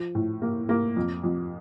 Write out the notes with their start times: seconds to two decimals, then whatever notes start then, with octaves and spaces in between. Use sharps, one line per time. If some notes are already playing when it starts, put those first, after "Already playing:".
Already playing: F3
0.15 A2
0.42 A#3
0.69 A#3
0.96 F2
1.24 F2